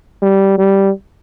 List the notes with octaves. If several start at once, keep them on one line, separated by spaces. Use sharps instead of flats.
G3
G3